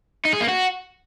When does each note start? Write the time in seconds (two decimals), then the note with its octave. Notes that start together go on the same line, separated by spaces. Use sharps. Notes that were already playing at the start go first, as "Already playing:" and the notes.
0.25 D#4
0.33 G#4
0.40 A#3
0.48 F#4